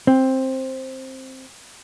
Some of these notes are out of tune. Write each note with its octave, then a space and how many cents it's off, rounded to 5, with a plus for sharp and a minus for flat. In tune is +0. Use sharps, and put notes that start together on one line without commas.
C4 +10